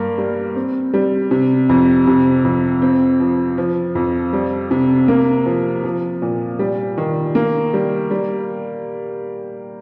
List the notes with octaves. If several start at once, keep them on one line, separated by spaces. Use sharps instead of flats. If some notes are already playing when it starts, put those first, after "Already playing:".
Already playing: G2 A#3
G3
C4
G3
C3
F2
C3
F2
C4
F3
F3
F2
G3
C3
A#3
F3
F3
A#2
G3
D#3
A#3
G3
G3